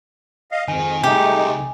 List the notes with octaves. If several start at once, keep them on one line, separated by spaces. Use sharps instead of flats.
D#5 F5
F2 G#2 D#3 G#5
C2 G#3 A3 D#4 G4